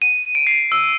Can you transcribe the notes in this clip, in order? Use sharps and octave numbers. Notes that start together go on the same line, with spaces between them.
D#7
D7
C7
E6